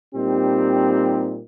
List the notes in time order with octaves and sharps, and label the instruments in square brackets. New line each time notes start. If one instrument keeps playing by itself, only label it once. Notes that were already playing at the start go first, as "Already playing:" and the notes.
[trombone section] A#2 G3 C4 D#4 G4